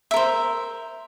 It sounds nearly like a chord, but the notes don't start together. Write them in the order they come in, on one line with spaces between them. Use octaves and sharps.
E5 A#4 C5